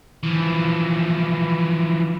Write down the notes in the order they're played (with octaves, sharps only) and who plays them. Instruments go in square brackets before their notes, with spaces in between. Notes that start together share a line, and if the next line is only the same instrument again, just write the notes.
[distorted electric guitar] E3 F3